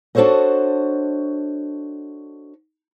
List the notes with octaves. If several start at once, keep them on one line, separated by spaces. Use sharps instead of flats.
D4 F#4 A4 C5 C#5 D#5